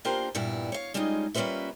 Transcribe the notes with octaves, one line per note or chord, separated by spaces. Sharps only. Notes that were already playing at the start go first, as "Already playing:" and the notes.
A#3 D4 F4 G4 A#4 C5
G2 A#2 G3 B3 E4
C#5 F5
G3 G#3 C#4 D#4 F4
G3 A#3 C#4 F4 B4 E5